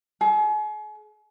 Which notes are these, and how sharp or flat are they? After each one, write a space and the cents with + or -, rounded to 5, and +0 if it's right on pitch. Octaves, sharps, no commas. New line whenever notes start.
G#4 +40